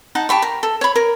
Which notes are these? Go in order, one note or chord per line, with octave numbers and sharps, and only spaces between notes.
D#4 F#5 A5
G4 A5 B5 C#6
A#4
A4
C#5 B5
A#4